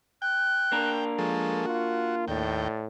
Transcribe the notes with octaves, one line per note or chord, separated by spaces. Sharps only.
G5 F#6
A#3 D4 A#4
F3 G#3 A4 C#6
F4 F#4
D#2 A2 D5 G5